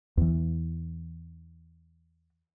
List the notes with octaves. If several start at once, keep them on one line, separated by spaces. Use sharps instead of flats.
E2 E3